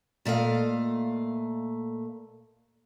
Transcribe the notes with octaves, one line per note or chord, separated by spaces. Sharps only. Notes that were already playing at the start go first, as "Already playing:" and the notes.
A#2 A3 D#5 F5